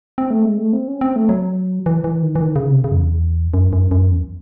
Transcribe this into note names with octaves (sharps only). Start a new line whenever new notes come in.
C4
A3
G#3
A3
C4
C#4
C4
A3
F#3
E3
E3
D#3
E3
D#3
C#3
C3
C#3
F#2
E2
F#2
F#2
F#2
E2